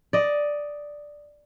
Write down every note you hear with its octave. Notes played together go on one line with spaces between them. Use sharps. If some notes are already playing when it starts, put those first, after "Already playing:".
D5 D#5